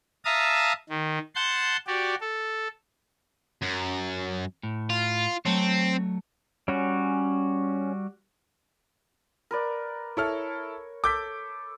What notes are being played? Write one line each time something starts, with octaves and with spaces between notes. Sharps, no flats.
E5 F5 A5 A#5 D#6
D#3
F#5 A5 C6 G6
F#4 G4 D5
A4
F#2
A2
F4
F#3 A3 C4 C#5
G3 C#4 F#4
A#4 B4 D5
E4 A4 C#5 F6
A4 D6 G6 B6